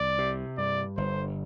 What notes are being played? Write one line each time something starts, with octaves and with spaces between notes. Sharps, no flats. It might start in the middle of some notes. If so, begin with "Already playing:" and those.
Already playing: C2 D5
C3
G2 D5
G1 C5